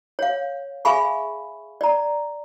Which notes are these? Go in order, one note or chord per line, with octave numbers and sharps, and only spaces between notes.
C#5 F5
G#4 E5 F5 G#5 B5 C#6
D5 A#5